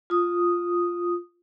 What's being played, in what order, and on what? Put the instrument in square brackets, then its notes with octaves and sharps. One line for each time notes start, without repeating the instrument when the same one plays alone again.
[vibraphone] F4 D#6